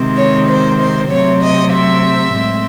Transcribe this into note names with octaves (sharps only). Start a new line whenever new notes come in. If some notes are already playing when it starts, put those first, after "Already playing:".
Already playing: C3 D#3 G#3 C4
C#5
C5
C5
C3 F#3 A3 C4 C#5
D#5
E5
A2 G#3 C4